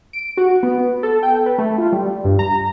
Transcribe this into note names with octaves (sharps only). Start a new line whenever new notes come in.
D7
F#4
B3
A4
G5
B4
A3
F4
G3
G2
A#5